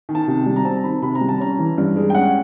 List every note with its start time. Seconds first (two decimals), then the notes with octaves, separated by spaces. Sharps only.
0.09 D#3
0.15 A5
0.28 C3
0.46 G3
0.56 A#5
0.65 C4 A5
0.83 D#3 B5
1.02 C3 B5
1.15 A#5
1.21 G3
1.29 A5
1.40 C#4 A#5
1.59 E3
1.78 G2
1.96 G#3
2.10 G5
2.15 C#4 F#5